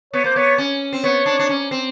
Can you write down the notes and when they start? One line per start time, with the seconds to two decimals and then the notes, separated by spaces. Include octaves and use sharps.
0.13 B3 C#5
0.24 A#3 C5
0.36 B3 C#5
0.58 C#4
0.93 C4
1.04 B3 C#5
1.26 D4
1.39 D4
1.49 C#4
1.71 C4